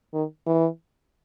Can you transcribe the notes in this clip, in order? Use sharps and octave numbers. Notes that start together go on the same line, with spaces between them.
D#3
E3